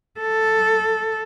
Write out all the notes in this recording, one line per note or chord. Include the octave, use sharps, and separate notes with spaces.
A4